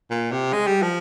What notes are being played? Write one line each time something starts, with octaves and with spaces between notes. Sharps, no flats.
A#2
C3
G#3
G3
F3